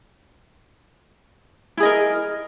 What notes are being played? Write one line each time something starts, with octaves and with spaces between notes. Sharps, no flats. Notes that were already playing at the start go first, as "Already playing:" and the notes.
E4 G#4 A#4 D#5